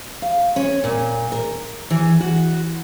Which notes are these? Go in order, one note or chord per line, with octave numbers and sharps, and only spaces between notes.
F5
C#4
A#2
A#4
E3
F#4